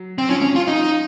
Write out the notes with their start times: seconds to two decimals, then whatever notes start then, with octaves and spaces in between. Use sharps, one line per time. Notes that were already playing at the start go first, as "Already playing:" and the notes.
Already playing: F#3
0.18 C4
0.30 F3 C#4
0.42 C#4
0.56 F4
0.68 D#4